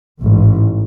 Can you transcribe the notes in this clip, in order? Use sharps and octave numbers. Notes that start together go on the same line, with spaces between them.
A1 G#2